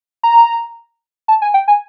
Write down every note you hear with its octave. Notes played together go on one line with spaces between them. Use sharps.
A#5
A5
G#5
G5
G#5